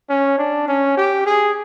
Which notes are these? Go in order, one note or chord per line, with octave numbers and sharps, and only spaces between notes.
C#4
D4
C#4
G4
G#4